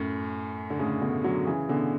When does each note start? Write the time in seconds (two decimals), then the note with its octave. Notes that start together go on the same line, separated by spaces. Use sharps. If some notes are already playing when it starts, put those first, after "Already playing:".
Already playing: F#2 A2
0.70 D3
0.79 A2 C#3
1.02 B2 D3
1.24 D3 F#3
1.47 C#3 E3
1.69 B2 D3